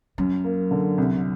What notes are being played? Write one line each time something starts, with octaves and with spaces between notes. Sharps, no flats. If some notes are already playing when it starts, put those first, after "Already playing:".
F#2 F#3
A#3
D3
C2